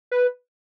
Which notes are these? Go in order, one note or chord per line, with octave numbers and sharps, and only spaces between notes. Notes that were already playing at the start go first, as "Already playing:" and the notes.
B4